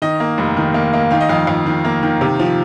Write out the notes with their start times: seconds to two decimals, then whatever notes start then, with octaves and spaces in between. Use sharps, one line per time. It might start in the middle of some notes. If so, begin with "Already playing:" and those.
0.02 D#3 D#5
0.20 A#3
0.38 F1
0.57 D#3
0.74 A#3
0.94 A#3
1.11 D#3 F5
1.21 D#5
1.29 F2 F5
1.47 F2
1.66 D#3
1.84 A#3
2.03 D#3
2.21 C3
2.39 F3